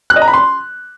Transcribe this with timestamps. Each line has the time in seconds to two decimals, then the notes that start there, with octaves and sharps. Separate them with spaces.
0.10 F#6
0.16 D#5
0.22 A#5
0.28 B5
0.34 C6